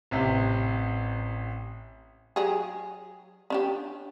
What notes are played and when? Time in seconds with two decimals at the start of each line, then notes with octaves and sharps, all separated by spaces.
0.11 A1 C3
2.36 F#3 G4 G#4
3.50 C#4 D4 G4